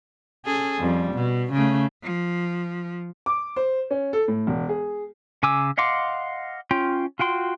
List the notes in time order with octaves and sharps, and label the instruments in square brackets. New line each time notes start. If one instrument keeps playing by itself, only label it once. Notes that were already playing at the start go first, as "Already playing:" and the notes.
[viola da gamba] C#4 G#4 A4
F2 G3
B2
C#3 A3
[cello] F3
[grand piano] D6
C5
C#4
A4
A2
E1
G#4
[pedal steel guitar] C#3 G#5 D6 E6
D#5 F5 F#5 C6 D6
C#4 F4 G5
F4 F#4 G5 C6